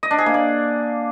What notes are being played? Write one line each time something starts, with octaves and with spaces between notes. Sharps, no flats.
D#5
D4
G#4
A#3
D5